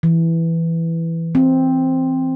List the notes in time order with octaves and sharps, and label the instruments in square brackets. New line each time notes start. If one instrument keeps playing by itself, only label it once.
[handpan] E3
C4